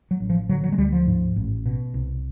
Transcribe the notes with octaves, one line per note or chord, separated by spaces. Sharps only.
F#3
A1
F3
D3 F#3
F#3
G#3
D2 G3
F3
G#2
A1
B2
C2